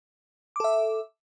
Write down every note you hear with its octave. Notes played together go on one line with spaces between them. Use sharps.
A4 E5 D6